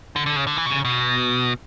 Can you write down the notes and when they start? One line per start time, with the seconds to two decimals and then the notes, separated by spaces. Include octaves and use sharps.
0.16 D3
0.26 D3
0.36 C#3
0.47 D3
0.57 E3
0.66 B2
0.70 C#3
0.85 B2